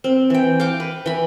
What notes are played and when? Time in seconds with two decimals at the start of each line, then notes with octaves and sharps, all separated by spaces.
0.04 C4
0.30 E3 G5
0.60 F5 G5 C#6 D6
0.80 B4
1.06 E3 B5